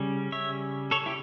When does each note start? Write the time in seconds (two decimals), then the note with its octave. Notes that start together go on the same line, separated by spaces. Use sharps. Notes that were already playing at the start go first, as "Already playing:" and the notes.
Already playing: C#3 G3 C#4
0.32 C#5 E5
0.91 A4 C#5
1.06 E4 G4